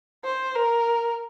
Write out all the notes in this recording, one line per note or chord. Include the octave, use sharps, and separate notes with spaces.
C5
A#4